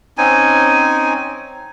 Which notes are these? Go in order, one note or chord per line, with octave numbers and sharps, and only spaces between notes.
C4 C#4 D#4 G#5